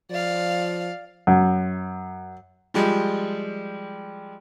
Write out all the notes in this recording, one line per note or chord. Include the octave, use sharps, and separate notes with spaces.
F3 D5 F5
F#2
F3 G3 G#3